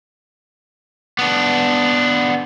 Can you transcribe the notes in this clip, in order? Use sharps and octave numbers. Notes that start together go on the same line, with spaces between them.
B3 D4